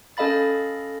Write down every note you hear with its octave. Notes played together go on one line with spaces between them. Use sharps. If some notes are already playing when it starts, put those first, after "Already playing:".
C#4 A4 D#5 F5 B5 A6